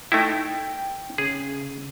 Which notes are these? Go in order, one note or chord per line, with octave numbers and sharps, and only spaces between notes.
A3 D#4 E4 G5
C#3 G#4